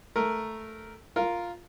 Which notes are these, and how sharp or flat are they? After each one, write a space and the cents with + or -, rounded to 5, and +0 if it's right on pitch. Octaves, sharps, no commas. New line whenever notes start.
A3 +0 A#4 +0
F4 +0 A#4 +0